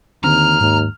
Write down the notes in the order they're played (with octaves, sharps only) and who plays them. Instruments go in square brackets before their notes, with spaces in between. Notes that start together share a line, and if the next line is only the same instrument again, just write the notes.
[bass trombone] D#2 [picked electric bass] D3 D#3 C4 [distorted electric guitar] A#5 [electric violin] F6
[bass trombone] D#2 [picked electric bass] G#2